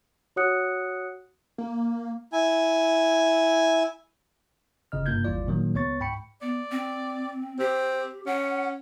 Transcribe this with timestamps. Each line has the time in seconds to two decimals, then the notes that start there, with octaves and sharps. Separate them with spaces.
0.36 F#4 C#5 F#5 D#6 F#6 C#7
1.58 A#3
2.33 E4 G#5
4.92 G1 C#3 D#5 F6
5.06 G2 C3 A#3 F4 G6 G#6
5.25 G1 D#2 E3 G3 F4 D5
5.47 A#2 D#3 F#3 A#3
5.75 C#2 B3 C#5 C#6 A6
6.00 G#2 G5 B5 C#6 C#7
6.42 B3 D5
6.72 C4
7.59 C4 G4
8.26 C#4 F#5